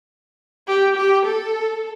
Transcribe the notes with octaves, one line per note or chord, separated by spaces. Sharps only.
G4
G4
A4